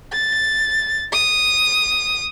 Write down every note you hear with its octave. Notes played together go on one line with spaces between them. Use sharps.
A6
D#6